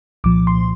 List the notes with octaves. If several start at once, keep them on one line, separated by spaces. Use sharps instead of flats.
C2 A#2 F3 D6
C6